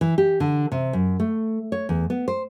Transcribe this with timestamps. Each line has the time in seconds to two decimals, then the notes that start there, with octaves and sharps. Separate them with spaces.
0.01 E3
0.18 G4
0.40 D3
0.72 C3
0.93 F#2
1.20 A3
1.72 C#5
1.89 E2
2.10 B3
2.28 C5